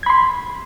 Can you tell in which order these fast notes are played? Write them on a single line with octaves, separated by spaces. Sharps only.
G#6 B5 C6